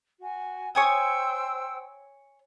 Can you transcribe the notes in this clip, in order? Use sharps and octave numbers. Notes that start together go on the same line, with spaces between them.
F#4 G#5
C5 C#5 G5 G#5 D#6 E6